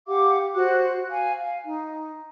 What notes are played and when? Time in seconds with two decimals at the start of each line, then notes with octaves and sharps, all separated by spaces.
0.07 G4 F5 F#5 D6
0.56 F#4 C5 F#6
1.10 F5 G#5
1.37 F5
1.65 D#4